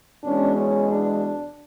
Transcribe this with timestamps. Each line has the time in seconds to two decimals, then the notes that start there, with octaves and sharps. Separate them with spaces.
0.23 E2 B2 G#3 C#4 D4
0.56 C#4
0.89 D4